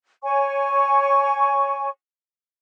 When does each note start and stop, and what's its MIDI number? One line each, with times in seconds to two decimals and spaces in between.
0.23 1.89 73
0.23 1.89 80
0.23 1.89 85